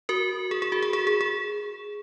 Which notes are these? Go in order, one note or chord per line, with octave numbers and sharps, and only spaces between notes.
F#4 A#4
G#4
G#4
F#4
G#4
G#4
G#4
G#4